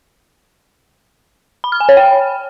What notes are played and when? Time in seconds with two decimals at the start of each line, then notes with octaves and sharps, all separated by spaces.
1.64 B5
1.72 F6
1.80 G#5
1.89 C#5
1.97 G5